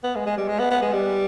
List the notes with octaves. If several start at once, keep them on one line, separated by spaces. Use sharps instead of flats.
B3
G#3
G#3
G3
G#3
B3
B3
G#3
G3